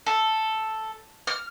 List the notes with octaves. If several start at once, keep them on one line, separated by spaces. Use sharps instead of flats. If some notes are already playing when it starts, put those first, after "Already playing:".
A4
F6